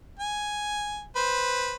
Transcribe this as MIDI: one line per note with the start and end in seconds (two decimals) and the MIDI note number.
0.19 1.04 80
1.16 1.74 71
1.16 1.74 72